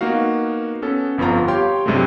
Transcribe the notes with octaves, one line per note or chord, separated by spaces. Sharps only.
A#3 B3 D#4 F#4 F5
B3 C#4 A4
G1 F2 B3 F4 A#5
G4 C#5 F5 G5 C6
C2 G2 C3 F#3 G#3 A3